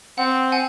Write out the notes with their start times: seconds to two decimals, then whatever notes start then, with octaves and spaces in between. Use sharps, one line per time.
0.18 C4 F#5
0.52 F#5 G#5